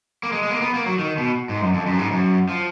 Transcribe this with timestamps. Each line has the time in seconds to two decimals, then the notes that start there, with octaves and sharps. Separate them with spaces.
0.23 A#3
0.32 G#3
0.42 G#3
0.51 A#3
0.61 B3
0.74 A#3
0.86 F#3
0.99 D#3
1.18 B2
1.49 G#2
1.61 F#2
1.74 F2
1.87 F#2
1.99 G#2
2.12 F#2
2.49 F3